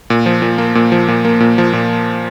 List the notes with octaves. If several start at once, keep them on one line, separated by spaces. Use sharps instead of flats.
A#2
F3
A#2
A#3
A#2
F3
A#2
A#3
A#2
F3
A#2